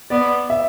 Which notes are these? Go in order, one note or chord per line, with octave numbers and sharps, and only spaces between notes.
B3 D5
E5